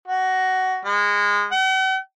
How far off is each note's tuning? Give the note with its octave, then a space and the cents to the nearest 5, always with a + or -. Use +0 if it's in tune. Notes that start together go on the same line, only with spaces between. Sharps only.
F#4 +15
G#3 -20
F#5 +45